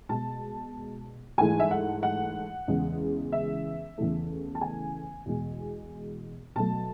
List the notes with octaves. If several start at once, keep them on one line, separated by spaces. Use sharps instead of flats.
B2 G#3 A5
G#2 E3 A3 G#5
E5
F#5
F#5
E2 C#3 G#3
E5
E2 C#3 E3 A3
A5
G#5
E2 B2 G#3
B2 F#3 A3 A5